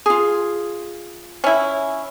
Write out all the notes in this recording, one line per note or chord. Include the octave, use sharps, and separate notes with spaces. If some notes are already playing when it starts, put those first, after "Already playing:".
F4 G#4
C#4 E4